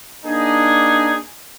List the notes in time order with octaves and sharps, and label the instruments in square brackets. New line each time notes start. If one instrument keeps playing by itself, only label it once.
[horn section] A#3 D4 D#4 G#4